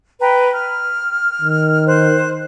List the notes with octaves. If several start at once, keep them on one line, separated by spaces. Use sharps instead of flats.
B4 G5 A#5
F6
D#3
C5 F#6